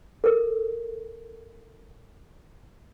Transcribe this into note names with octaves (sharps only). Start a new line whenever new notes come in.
A4 A#4